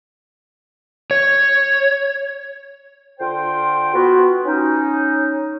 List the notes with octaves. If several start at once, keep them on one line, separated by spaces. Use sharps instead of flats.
C#5
D3 F4 C5 G5
B3 F4 F#4
C#4 D#4